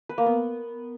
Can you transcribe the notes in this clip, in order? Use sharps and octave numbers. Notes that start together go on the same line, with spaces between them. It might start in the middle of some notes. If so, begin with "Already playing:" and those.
B4
A#3
B3